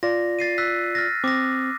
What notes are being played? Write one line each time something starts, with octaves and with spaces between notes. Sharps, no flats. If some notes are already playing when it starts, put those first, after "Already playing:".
F4 D5 A#6
A6 C7 D#7
E6 F#6 B6
F6 A6 A#6
C4 D6 D#6 A#6